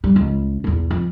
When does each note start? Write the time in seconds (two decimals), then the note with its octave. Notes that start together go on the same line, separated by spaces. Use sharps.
0.04 G3
0.16 C#2
0.64 B1 E2
0.91 F2